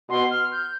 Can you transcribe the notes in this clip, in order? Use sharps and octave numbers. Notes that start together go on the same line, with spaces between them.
B2 C6
F6
G6